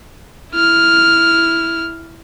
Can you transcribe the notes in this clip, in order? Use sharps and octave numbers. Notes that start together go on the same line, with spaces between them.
E4 F6